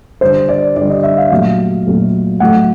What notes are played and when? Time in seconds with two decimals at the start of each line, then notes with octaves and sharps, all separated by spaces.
0.21 D3 G3 C5
0.49 D5
0.76 D3 G3 D5
0.90 D#5
1.03 E5
1.18 F5
1.31 A#2 F#3 A3 F5
1.86 A#2 F#3 A3
2.40 A2 F#3 A3 F#5